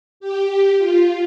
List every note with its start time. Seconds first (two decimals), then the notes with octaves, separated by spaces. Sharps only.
0.20 G4
0.78 F4